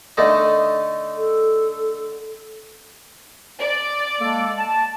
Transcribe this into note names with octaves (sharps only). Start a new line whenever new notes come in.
D3 A3 D#4
A4
D5
G#3 A#3 A4
A5